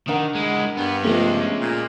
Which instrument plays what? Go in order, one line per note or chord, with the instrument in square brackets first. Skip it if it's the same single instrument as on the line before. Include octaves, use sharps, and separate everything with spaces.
[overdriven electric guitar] D#3 [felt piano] D4 A#4 F#5
[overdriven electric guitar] G#3 E4
[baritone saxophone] G2 [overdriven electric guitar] B3
[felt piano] F3 A3 B3 [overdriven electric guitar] G#3 C#4
[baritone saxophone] A#2